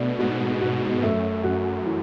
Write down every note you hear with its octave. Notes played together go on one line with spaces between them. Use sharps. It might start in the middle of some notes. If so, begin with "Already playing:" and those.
Already playing: B2 A3 D4
G#2 F#4
F#4
F#2 A3
F#4
E3